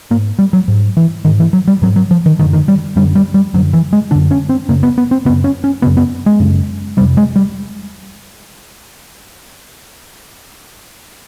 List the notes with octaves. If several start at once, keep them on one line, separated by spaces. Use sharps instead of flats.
G#2 A#3
G3
F#3
G#2
E3
G#2 D#3
E3
F#3
G3
G#2 F#3
F#3
F3
D#3
F#2 D3 D#3
D#3
G3
F#2 D3 G3
G3
G3
F#2 D3 F#3
E3
G#3
F#2 D3 D4
C#4
C4
F#2 C#3 A#3
B3
B3
C4
F#2 C#3 B3
C#4
C#4
F#2 C#3 B3
B3
G#3
F#2 C#3
F2 C3 G3
G#3
G3